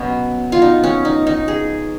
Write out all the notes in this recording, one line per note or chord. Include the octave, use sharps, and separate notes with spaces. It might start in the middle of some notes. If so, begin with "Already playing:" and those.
Already playing: B2 F#3 B3 C#4
F4
D#4
C#4
D#4
D#4
G#4